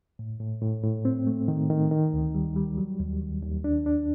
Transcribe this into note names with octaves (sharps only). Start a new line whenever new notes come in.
A2
A2
A2
A2
C4
A3
D#3
D#3
D#3
D2
G3
G3
F#3
D#2
D#3
D#2
D4
D4